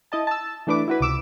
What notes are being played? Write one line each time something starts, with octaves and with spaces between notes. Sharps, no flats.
E4 D#5 A5
A5 E6
E3 A3 D4 B4 D6
E4 F#4 B4
C#2 C3 D6 E6 E7